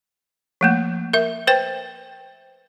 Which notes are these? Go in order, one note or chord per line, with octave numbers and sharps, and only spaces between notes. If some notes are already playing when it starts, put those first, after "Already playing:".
F3 A3 A#3
A#4 E5
B4 C5 G5